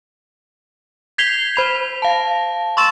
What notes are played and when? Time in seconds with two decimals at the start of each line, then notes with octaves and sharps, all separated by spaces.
1.18 G6 G#6 B6 C7 F7 G7
1.56 C5 B5 F7
2.02 F5 A5
2.77 C6 C#6 E6 A6 E7